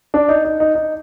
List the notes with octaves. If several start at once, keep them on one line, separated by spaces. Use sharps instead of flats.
D4
D#4
D#4
D#4
D#4